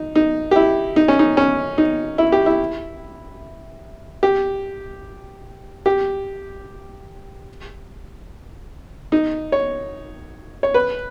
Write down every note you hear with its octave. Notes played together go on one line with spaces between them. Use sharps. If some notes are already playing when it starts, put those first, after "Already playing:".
Already playing: D#4
D#4
G4
E4
D#4
C#4
D#4
C#4
D#4
E4
G4
E4
G4
G4
D#4
C#5
C#5
B4